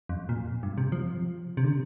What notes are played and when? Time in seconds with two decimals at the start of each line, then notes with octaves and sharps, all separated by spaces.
0.09 F2
0.29 A#2
0.63 G2
0.78 C3
0.92 F3
1.57 C3
1.64 D3